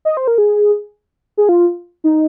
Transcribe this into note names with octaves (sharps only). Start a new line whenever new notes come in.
D#5
C5
A#4
G#4
G#4
F4
D#4